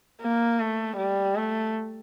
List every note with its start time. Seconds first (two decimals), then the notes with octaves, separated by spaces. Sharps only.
0.22 A#3
0.60 A3
0.97 G3
1.36 A3